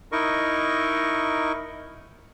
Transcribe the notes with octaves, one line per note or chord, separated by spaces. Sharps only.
D#4 E4 A#4 D#5 C#6